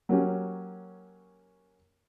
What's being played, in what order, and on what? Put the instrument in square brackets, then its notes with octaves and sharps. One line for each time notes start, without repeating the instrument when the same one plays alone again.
[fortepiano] F#3 A#3 C#4 G4